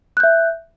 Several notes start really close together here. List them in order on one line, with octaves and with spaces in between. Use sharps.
F#6 G6 E5